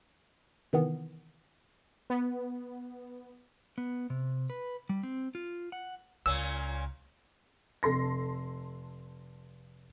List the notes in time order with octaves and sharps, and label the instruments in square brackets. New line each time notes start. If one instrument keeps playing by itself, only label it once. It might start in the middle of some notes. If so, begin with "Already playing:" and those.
[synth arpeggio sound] C3 D#3 E3 B3
[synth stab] B3
[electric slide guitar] B3
C3
B4
G3
C4
F4
F#5
[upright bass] C#2 [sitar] A#2 A#3 C#4 [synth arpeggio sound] E6
[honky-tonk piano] F1 A4 C6 A#6